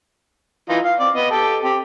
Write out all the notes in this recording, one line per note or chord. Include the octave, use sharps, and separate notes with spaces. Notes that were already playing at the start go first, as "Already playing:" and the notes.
E3 D#4 F4
F5
C4 D5
B3 D#5
G4 A4 G5
C4 G4